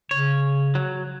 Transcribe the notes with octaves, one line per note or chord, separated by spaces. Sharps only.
C#3 C#5
F#3